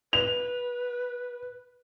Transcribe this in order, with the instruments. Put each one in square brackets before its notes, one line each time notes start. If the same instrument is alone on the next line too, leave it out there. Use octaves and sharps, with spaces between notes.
[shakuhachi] B4 [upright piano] F7